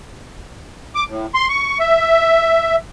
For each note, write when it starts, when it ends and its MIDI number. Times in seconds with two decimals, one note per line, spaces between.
0.95 1.04 86
1.08 1.26 45
1.35 1.48 84
1.49 1.78 85
1.79 2.76 76